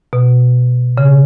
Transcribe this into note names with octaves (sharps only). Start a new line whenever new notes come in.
B2
C#3